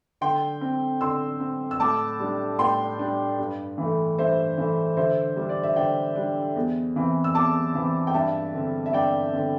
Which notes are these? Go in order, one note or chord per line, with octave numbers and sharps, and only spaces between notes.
D3 G5 C6
C4
D3 C6 E6
C4
E6
A2 A5 D6
G3 D4
A2 G5 C6
G3 D4
G2
E3 A3
G2 C5 E5
E3 A3
D3 C5 E5
G3
D4
D5
E5
D3 D5 G5
G3 D4
E2
E3 C4
E6
E2 A5 D6
E3 C4
G5
G2 E5 A5
D3 C4
E5
G2 D5 G5
D3 C4